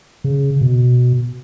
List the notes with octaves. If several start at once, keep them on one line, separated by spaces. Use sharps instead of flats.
C#3
B2